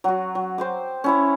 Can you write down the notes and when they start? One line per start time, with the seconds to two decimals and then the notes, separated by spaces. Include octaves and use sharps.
0.04 F#3 F#4
0.35 F#3
0.58 C5 G5 D6
1.04 C#4 E4 C#6